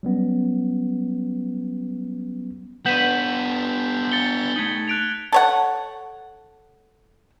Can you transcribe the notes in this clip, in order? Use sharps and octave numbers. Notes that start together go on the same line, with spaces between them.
F#3 G3 B3 C#4
B3 D4 B4 F#5 G6 B6 E7
A6 C#7 G7
A3 D#4 G#6 B6 F#7
F#6 D7 F7
A4 C#5 F#5